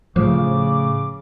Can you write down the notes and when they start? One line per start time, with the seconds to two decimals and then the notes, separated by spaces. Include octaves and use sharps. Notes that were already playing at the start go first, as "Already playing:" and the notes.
0.16 A2 C#3 F3 A3 D6